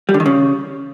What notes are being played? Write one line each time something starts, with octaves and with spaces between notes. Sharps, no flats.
G3
D3
D#3
C#3